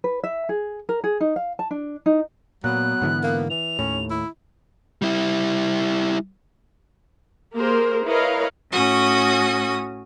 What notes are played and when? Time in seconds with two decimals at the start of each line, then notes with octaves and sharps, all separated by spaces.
0.04 B4
0.24 E5
0.49 G#4
0.89 A#4
1.04 G#4
1.20 D#4
1.36 F5
1.59 A5
1.71 D4
2.06 D#4
2.64 A#2 F#3 B3 F#6
3.01 G#2 D3 E3
3.23 A#3
3.50 E3 F7
3.79 D#2 A2 C#4
4.10 E4
5.02 G3 E4
7.53 A#3 G4 G#4 A#4 C5
8.05 E4 A#4 B4 C#5 D#5 F5
8.71 A2 C#4 F#4 D#6